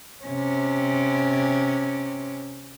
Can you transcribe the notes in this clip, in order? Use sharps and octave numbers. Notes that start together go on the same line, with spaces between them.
C3 C#4